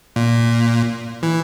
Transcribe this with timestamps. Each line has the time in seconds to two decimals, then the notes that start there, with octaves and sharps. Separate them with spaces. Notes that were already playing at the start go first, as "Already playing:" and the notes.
0.16 A#2
1.23 E3